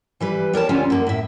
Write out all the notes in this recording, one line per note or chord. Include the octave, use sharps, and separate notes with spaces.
E3 G3 B4
G3 A#4 C#5 A5
D2 G3 C#4 F4 G#5
F#2 A#3
A2 E5